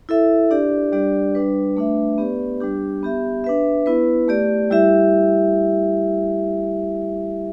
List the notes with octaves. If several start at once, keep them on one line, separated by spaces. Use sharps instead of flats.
E4 A4 E5
D4 G4 D5
G3 D4 G4 D5
G3 D4 B4
A3 D4 B4 E5
B3 G4 B4 D5
G3 D4 G4
B3 G4 E5
D4 B4 E5
B3 E4 B4
A3 G4 D5
G3 E4 G4 E5